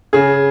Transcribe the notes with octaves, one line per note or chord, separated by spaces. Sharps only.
C#3 G#4